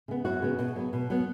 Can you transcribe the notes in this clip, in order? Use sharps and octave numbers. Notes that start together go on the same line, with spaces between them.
C#3 B3
F#2 F#4
C#3 B3
B2
F#3 B3
B2
F#3 B3